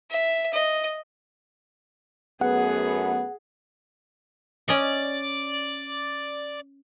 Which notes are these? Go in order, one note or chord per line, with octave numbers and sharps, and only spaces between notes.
E5
D#5
F#2 A3 B3 G#4 F#5
C#4 D5 D#5